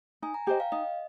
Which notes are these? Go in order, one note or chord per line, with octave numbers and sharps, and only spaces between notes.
D#4 G#5
A#5
G4 C5 D#5 G5
F5
D#4 D#5